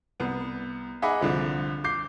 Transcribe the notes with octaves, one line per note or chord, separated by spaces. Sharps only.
C2 B3
D#4 G#4 E5 F#5 B5 D6
C2 D3 F3
D6 G6 C7